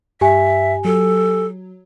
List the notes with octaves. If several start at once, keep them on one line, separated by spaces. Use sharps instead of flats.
G2 G4 E5 G#5
F#3 A4